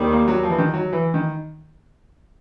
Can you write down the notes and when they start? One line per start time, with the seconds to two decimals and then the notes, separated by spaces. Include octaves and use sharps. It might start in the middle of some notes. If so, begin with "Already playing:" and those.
Already playing: D#2 D#3 G3
0.13 A#3
0.28 F#3
0.43 F3
0.50 E3
0.58 D#3
0.74 F#3
0.93 E3
1.14 D#3